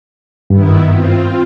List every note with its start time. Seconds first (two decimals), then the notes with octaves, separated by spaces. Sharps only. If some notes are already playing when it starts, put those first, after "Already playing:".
0.50 G2 D#3 B3 E4
0.87 C4 F4